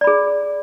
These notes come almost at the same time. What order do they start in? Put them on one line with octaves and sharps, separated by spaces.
D5 B5 G#4